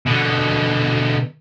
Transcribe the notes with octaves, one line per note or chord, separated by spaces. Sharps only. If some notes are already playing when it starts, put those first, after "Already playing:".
B2 D3